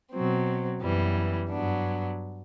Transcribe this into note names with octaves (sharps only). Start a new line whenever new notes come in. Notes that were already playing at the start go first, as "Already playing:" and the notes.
B2 F#3 C4
F#2 E3 G3 B3
G2 F#3 B3 D4